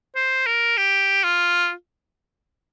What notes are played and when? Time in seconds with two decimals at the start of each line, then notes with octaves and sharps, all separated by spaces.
0.16 C5
0.46 A#4
0.77 G4
1.24 F4